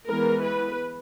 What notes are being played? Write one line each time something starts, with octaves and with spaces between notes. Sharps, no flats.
E3 G#3 B3 A#4
B4